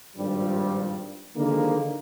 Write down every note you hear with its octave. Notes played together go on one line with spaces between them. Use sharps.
G#1 G2 A#2 F3 G3
D3 D#3 F3 G3 G#3 A#3